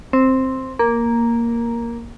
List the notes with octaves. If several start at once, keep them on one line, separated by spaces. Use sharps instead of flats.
C4
A#3